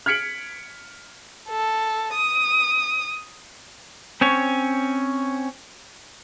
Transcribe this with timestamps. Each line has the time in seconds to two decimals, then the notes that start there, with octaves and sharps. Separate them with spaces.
0.06 F6 G#6 B6 C#7 D7 F#7
1.49 A4
2.14 D#6
4.21 C4 C#4 C#5